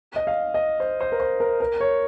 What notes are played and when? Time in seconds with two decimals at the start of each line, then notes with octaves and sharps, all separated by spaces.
0.16 D#5
0.27 F5
0.54 D#5
0.80 C5
1.01 C5
1.12 A#4
1.20 C5
1.40 A#4
1.60 A#4
1.80 C#5